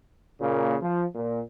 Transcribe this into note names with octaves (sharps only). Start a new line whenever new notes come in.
A#2 C#3 A#3
F3
A#2